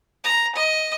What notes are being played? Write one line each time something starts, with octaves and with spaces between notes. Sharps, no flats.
A#5
D#5